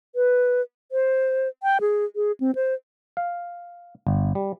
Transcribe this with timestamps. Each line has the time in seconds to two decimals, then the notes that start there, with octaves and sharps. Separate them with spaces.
0.15 B4
0.92 C5
1.63 G5
1.81 G#4
2.16 G#4
2.40 C4
2.55 C5
3.17 F5
4.07 G1
4.35 G3